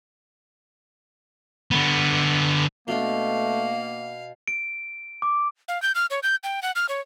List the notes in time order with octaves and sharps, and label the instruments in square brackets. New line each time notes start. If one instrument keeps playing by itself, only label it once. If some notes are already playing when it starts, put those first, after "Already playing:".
[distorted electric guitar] D3 B3
[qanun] B2 D4 B5 [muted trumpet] A3 [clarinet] A#3 [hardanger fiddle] F5
[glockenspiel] D7
D6
[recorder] F5
G6
F6
C#5
G6
G5
F#5
F6
C#5